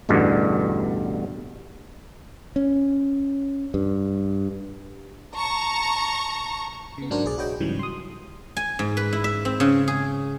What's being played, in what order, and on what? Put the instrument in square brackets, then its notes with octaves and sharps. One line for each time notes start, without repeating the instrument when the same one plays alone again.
[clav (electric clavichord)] A1 E2 G2 B2 D3
[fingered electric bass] C#4
G2
[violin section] A5 A#5 C#6
[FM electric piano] C#3 B3
G#2 F#3 D4 F#4 A#4 C5
B1 G#4 D5
F#4 G#4 B4 C#5 D#5 G5
G#2 C#3 E3 F#3 G3
C6 D#6
[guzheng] G#5
G#2
B4
E4
E5
C4
C#3
G#4